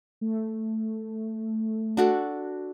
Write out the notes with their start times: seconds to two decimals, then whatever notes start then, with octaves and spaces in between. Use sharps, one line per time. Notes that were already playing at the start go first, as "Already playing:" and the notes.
0.21 A3
1.97 D4 F#4 A4